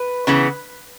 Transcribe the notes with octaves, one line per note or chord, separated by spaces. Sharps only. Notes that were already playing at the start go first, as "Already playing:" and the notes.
Already playing: B4
C#3 E3 B3